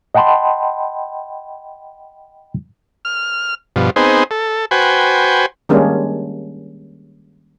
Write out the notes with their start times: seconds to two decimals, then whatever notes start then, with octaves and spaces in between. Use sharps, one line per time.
0.15 D#5 F#5 G5 A5 B5 C6
3.05 F6
3.76 G2 B2 F3
3.96 B3 C4 D#4 G#4 C5
4.31 A4
4.71 F#4 B4 C5 G5 G#5
5.69 D#3 G3 G#3 A#3 C#4 D4